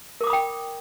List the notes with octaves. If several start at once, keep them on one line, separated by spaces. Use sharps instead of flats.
A#4 G5 B5 D6 D#6